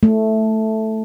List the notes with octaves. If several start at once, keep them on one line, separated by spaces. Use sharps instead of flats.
A3